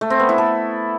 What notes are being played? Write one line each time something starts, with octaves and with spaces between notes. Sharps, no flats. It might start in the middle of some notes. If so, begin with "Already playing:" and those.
A3
C4
B3
E4
A4